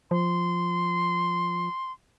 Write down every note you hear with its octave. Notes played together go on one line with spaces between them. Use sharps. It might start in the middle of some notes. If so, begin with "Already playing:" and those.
F3 C6